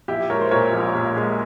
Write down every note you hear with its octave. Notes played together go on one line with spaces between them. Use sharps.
A#1 E4 G4
G#3 A#4 C#5
C5
A#2 A#4 C#5
A#1
A#1
G#3